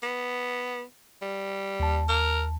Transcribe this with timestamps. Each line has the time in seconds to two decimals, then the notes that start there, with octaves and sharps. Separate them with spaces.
0.03 B3
1.22 G3
1.80 D#2 A5
2.09 A#4